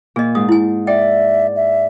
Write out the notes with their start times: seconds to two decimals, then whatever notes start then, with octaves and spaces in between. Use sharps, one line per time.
0.16 A#2 G#4 D#5
0.35 G#2 D#6
0.49 E4 G#5
0.87 D5 E5 G5
1.56 E5